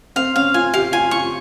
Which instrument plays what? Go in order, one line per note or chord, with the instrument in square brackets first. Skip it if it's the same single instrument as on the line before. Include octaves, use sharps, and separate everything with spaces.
[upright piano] C4 [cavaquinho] F5
[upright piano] C#4 [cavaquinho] F5
[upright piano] F4 [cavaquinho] G#5
[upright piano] G4 [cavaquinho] F5
[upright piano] F4 [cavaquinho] G#5
[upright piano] F4 [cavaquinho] C#6